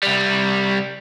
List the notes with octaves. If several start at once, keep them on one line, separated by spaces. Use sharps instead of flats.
C2 G3